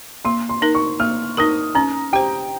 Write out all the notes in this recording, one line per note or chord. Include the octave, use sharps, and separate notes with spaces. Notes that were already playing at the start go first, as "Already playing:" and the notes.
A#3 C6
C6
D#4 A#4
C#6
A#3 F6
D#4 A#4 D#6
C#4 A#5
G4 C5 G5